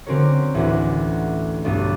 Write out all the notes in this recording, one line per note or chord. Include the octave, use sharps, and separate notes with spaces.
D3 C4 C#4 F#4 A#4 C#5
A1 D2 C#4 F#4 B4 F#5
B1 G2 B3 D4 D#7